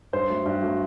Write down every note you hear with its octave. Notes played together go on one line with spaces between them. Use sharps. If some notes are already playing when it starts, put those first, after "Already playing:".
G2 C5
F#3 A3
G2
F#3 A3